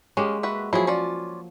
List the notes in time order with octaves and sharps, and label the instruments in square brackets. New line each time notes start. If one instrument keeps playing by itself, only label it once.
[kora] G#3 A#3 G4 [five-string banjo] C#4
[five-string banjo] F#4 B4 E5
[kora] F3 F#3 [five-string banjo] E4 G#4
[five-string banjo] C#4 F4 D5